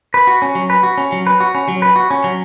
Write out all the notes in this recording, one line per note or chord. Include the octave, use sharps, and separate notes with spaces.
B4
F#4
C#4
F#3
B4
F#4
C#4
F#3
B4
F#4
C#4
F#3
B4
F#4
C#4
F#3